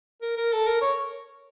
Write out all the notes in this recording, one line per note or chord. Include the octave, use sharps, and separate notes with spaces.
A#4
A#4
A4
A#4
C#5